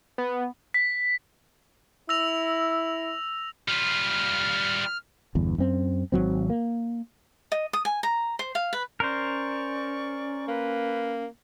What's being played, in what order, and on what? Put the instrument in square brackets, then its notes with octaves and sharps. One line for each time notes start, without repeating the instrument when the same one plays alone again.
[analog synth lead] B3
[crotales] B6
[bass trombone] E4 [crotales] E6 A#6 F7
[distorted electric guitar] G3 F4 [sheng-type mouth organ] F6
[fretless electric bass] G1 E2
F#2 C4
G#1 F2 F#3 C4
A#3
[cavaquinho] D#5
D#6
G#5
A#5
C5
F5
B4
[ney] C#4 [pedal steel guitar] A#4 C5 [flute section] D5 C#6
[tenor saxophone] A#3 [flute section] B4